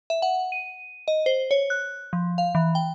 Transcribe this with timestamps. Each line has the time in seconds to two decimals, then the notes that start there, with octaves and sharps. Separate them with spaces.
0.10 E5
0.22 F#5
0.52 D#7
1.08 D#5
1.26 C5
1.51 C#5
1.70 F#6
2.13 F3
2.38 F5
2.55 E3
2.75 G5